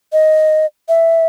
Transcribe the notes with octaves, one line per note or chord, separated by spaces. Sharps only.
D#5
E5